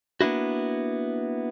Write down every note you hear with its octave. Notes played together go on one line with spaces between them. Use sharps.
A#3 B3 D4 E4 F#4